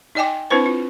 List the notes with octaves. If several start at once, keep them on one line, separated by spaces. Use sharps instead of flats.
D#4 D5 D#5 G5 G#5 D6
C4 D4 E4 B4 C5
F4